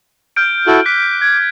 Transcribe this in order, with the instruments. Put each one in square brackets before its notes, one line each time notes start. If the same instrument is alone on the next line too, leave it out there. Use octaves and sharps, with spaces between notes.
[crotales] F6 G6 D7
[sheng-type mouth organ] E4 F#4 A4
[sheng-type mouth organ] D6 [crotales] F#6 B6
[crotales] G#6